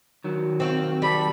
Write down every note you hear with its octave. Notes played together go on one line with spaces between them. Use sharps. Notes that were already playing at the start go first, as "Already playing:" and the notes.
D#3 F#3
C4 F#4 F5
G3 A5 B5